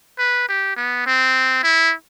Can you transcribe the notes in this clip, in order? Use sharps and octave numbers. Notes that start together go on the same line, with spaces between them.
B4
G4
B3
C4
E4